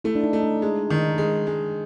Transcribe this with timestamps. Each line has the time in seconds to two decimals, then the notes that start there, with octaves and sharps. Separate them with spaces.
0.04 A3 E4
0.15 D4
0.24 D#4
0.33 A3
0.43 D4
0.62 G#3
0.90 D#3
1.18 G#3
1.47 G#3